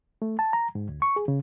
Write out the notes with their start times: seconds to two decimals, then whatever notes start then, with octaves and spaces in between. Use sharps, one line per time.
0.22 A3
0.39 A5
0.53 A#5
0.75 G#2
0.89 D2
1.02 C#6
1.16 G#4
1.28 C#3